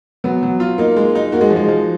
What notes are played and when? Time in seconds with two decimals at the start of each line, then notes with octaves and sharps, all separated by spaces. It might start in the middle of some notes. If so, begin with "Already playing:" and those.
0.24 F#3 B3
0.43 F#3
0.60 F4
0.78 A#3 D#4
0.96 G#3
1.15 D#4
1.32 A#3 F#4
1.41 G#3
1.50 F3
1.56 G#3
1.68 F3